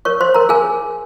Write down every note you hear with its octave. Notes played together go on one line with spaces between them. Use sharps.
A#4 C#5 C#6
C5 C6
C#5
A#4 A#5
G#4 A#4 G#5